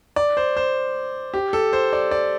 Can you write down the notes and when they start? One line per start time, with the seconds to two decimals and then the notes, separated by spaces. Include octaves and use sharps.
0.16 D5
0.37 C5
0.57 C5
1.34 G4
1.53 A4
1.73 C5
1.93 D5
2.11 D5